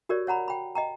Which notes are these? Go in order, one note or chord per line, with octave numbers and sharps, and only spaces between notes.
F#4 G4 A#4 C#5 D5
C#5 F#5 A#5 B5
G5 B5
D#5 G5 A#5